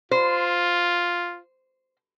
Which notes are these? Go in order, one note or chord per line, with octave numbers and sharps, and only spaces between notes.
F4 C5